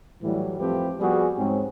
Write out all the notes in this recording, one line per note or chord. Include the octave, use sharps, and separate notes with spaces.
A2 E3 F#3 G3
F2 F3 A3 C4 G4 B4
F3 G3 B3 F#4 G#4
G#2 C4 C#4